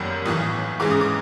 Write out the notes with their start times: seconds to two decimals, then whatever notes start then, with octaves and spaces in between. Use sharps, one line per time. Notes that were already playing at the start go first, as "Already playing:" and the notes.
Already playing: G1 F#2 D#3 G3 A#3
0.25 B1 A2 E3 D#6
0.80 G#2 E3 G#3 C#4 D6
0.91 D#6
1.01 D6